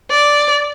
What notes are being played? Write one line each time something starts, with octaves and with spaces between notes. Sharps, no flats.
D5